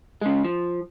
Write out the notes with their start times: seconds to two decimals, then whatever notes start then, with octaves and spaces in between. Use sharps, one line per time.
0.22 C#3 G#3
0.45 F3